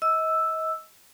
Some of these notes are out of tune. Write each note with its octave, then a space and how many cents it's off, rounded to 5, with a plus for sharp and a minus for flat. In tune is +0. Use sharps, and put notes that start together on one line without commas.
D#5 +35 E6 +0